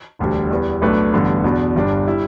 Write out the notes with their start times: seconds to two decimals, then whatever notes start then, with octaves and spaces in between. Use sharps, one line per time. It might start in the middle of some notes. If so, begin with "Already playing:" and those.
0.19 E1 D2 D3 G3
0.50 E2 E3 G3 B3
0.82 B1 A2 A3 D4 B4
1.13 A1 G2 D3 B3
1.44 E2 B2 B3 D4
1.76 G1 G2 G3 D4
2.07 G3 E4